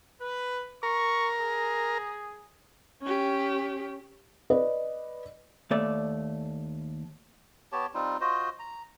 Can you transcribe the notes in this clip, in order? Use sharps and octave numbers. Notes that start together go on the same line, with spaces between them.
B4
A#4 C#6
G#4
C#4 G4
B4 D5 D#5
D#2 A3 D5
B3 G4 C#5 A5
G3 C4 D#4 F4
F4 F#4 C5 D#5
A#5